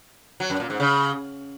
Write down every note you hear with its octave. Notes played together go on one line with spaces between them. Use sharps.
F#3
F#2
A#2
G#2
C#3